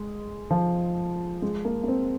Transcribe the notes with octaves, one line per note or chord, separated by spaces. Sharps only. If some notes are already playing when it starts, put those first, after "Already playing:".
Already playing: G#3
F3
G#3
A#3
A#3
C4